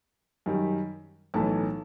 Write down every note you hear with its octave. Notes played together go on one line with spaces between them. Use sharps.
F#2 D#3 G3
B1 A2 E3 A3 A5